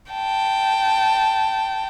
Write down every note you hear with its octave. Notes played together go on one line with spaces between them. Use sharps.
G5 A5